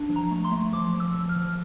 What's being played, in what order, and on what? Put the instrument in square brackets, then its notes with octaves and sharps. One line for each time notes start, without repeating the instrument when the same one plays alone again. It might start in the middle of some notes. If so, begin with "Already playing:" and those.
Already playing: [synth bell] D4
F3
A#5
A3
C6
A3
F3 D6
F3
E6
F3
F6
F3